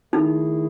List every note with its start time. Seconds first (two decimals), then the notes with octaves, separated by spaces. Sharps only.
0.13 D#3 A3 D#4 E4 G#4